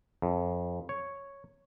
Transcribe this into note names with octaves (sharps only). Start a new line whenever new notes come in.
F2
C#5